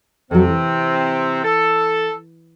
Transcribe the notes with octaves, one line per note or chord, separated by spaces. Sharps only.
F2 C3 F#3 C4
E3
A4